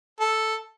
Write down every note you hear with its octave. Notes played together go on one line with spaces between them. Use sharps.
A4